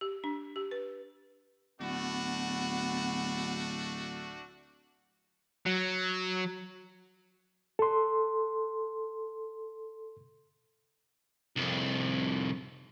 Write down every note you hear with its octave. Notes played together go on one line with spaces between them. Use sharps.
G4
D4
G4
B4
D1 A3 B3 D4 F#4
F#3
A4 C6
C2 F2